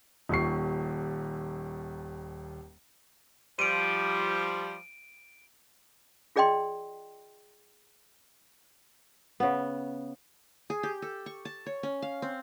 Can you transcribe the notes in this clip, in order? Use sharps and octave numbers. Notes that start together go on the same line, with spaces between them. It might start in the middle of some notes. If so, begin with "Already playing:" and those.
D#1 D#2 C#6 C7
F3 G3 D7 D#7
F4 G#4 D5 D#5 G5 C6
C#3 B3
G#4
G4
A4
C#6
A5
C#5
C#4
F5
C4